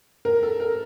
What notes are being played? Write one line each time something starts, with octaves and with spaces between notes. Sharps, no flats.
A#4
A4
A#4